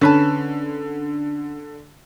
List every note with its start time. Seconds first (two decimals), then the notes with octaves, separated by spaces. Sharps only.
0.01 D3 C#4 B4 A5